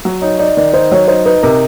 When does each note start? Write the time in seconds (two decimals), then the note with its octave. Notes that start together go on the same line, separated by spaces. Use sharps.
0.05 F#3
0.22 D#4 C#5
0.39 D#4 D5
0.57 D#3 D5
0.74 D#4 C5
0.92 F#3 C#5
1.08 D#4 C5
1.26 D#4 B4
1.43 C3 A#4